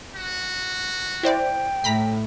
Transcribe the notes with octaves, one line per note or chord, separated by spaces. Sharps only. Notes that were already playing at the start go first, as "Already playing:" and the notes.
F#4
E4 C5 D5 G5
A2 A#5 B5 B6